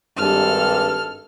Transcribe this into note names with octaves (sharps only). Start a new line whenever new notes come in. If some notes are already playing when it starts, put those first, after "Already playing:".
G#1 G2 A4 F6